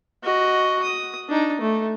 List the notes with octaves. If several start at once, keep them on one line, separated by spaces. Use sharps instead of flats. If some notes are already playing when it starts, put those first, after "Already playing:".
F#4 D#5
D#6
D4 D#4
A3